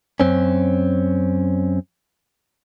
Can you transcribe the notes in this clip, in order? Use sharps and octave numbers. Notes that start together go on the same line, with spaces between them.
F#2 C4 C#4